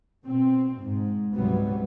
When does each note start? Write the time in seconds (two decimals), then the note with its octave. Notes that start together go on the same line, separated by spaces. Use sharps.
0.24 B2 C4
0.78 G#2
1.34 C#2 G#2 C3 F#3 G3 B3